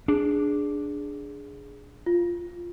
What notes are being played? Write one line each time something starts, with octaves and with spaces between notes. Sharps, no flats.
D4 G#4
F4